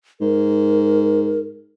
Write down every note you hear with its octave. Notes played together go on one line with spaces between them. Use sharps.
G#2 A#4